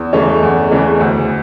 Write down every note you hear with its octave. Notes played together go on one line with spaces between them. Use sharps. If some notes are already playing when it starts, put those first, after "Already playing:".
Already playing: E2
C#3 E3 A3 C#4
E2
C#3 E3 A3 C#4
D2